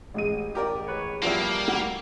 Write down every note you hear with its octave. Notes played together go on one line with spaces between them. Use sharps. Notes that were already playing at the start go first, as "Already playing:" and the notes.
A1 G#3 D#7
G4 A#4 D5
B4 C#5
F3 G3 A#3 B3 E4
A3 F#4